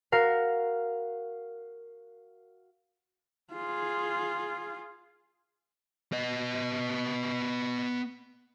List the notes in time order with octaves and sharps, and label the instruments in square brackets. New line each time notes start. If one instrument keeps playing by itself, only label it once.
[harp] F#4 A#4 F5
[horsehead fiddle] F4 G#4
[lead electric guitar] B3 D#5